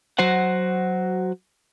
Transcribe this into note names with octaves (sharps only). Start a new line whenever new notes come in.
F#3 F#4 C5 F#5